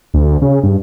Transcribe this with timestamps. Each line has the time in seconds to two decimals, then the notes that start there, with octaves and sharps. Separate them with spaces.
0.14 D2
0.42 C#3
0.63 G2